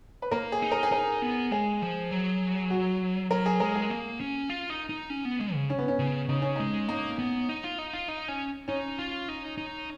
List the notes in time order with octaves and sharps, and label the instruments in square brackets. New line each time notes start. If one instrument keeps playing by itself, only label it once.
[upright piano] B4
[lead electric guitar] A#3 [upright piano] A#4
[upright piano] G#4
[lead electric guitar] D#4
[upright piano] A#4
G#4
[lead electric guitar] D#4 [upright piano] A#4
[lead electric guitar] B3
[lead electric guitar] G#3 [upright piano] G#4
[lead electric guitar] F3
F#3
[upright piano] F#4
[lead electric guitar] F#3 [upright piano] A#4
[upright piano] G#4
[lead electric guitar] G#3 [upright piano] A#4
[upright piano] G#4
[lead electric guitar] A#3
C#4
F4
D#4
D#4
C#4
B3
G#3
C#3
[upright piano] C#4
B3
C#4
[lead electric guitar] C#3
[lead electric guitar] C#3 [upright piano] D#4
[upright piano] C#4
[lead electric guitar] G#3 [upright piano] D#4
[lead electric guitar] A#3 [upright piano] D#4
[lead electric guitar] B3
D#4
F4
D#4
F4
D#4
C#4
[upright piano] C#4 [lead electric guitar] D#4
[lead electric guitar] F4
D#4
D#4